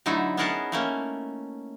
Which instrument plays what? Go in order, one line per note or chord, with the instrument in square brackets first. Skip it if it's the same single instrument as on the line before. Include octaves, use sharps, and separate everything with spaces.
[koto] D3 F#3 A3 D#4 E4
B3 C#4 G#4 A#4 F#5 A5
A3 A#3 C#4